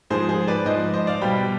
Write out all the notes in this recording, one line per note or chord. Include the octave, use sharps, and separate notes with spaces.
G#2 F3 G#4 C5
G#4 C5
B4 D5
G#2 F3 C5 D#5
C5 D#5
D5 F5
B2 G3 G5 B5